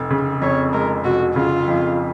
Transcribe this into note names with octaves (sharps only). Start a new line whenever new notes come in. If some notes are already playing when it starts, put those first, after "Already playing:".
Already playing: F1
C#3
F2 C#5
G#3 A#4
F1 F#4
C#3 F4
F2